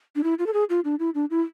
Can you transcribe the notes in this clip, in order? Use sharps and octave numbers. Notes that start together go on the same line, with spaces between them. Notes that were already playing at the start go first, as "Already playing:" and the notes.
D4
E4
F4
A4
G#4
F4
D4
E4
D4
E4